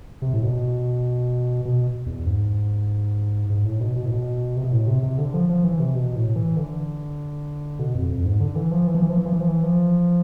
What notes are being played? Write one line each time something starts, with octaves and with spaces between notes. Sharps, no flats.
C3
A2
B2
B2
E2
G#2
G#2
A2
B2
B2
A2
B2
C3
B2
A2
C3
C3
D3
F3
F3
E3
C3
B2
A2
E3
D3
B2
F2
F2
G#2
D3
E3
F3
E3
F3
E3
F3
E3
F3
E3
F3
E3
F3